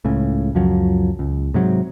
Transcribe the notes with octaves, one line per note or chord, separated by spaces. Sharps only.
C#2 A2 C#3
C#2 F#2 F3 F#3
C#2
G#2 C3 F#3